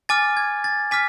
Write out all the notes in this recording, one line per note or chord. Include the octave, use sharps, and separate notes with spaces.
G#5 D6 F6 A6
G#6
A6
G#5 D6 F6 B6